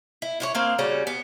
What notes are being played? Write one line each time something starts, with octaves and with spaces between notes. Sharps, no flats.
E4
E4 F4 C#5
A#3 C4 F5
C#3 G3 C#4 F#4
B3